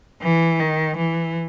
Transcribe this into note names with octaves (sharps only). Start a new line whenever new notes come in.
E3
D#3
E3